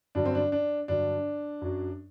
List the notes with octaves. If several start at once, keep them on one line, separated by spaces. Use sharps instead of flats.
G2 D3 F#3 D4
C4
D4
D4
G2 D3 F#3 D4
F#2 F#3